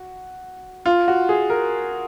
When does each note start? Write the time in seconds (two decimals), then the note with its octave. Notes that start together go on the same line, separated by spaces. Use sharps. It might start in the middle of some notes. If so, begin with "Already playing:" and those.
Already playing: F#4
0.86 F4
1.08 F#4
1.29 G#4
1.50 A#4